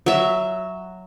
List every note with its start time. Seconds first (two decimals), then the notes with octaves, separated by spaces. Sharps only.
0.06 F#3 E5